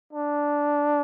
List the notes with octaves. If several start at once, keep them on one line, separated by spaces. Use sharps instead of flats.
D4